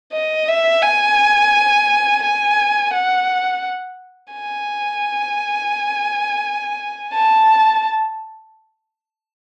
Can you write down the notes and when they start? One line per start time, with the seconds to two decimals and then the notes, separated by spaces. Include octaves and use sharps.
0.13 D#5
0.48 E5
0.82 G#5
2.23 G#5
2.93 F#5
4.33 G#5
7.14 A5